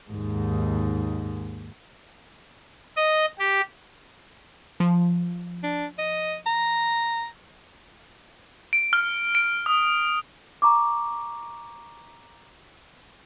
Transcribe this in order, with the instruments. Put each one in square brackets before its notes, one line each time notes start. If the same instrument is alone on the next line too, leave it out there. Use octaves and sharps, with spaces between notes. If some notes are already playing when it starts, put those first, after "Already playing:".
[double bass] D#2 G#2
[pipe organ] D#5
G4
[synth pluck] F3
[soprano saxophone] D4
D#5
A#5
[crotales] D7
F6
D7
D#6
[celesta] A#5 C#6 D6